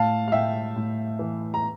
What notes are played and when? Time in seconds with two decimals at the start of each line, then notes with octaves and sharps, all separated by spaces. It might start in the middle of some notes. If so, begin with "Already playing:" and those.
Already playing: A2 F5 A5
0.28 F5
0.32 A2 E5 G5
0.76 A2
1.19 E3
1.54 A#5